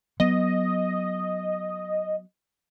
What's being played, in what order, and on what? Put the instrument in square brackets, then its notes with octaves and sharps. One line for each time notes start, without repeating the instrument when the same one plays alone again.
[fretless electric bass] F#3 B3 [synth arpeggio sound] D#5